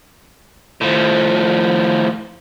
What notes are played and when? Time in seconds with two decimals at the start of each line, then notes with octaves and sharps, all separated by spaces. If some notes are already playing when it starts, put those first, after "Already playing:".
0.81 A2 F3